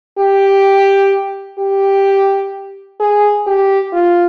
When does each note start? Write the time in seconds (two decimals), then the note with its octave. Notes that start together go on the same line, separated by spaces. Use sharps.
0.19 G4
1.59 G4
3.00 G#4
3.47 G4
3.93 F4